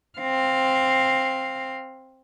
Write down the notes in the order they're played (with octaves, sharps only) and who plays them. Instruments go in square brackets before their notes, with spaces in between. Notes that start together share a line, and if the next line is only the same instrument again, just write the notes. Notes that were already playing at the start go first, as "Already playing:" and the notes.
[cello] C4 F5